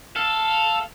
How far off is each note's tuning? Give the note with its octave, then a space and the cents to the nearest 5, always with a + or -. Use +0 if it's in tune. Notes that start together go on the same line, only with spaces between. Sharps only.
A4 +0 F5 +0